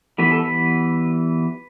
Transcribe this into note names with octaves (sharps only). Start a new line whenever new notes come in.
E3 G3 B3 B4
A4
B4